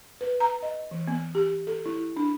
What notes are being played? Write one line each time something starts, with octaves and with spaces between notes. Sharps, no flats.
B4
A#5
D#5
E3
B3
G4
A4
E4
D4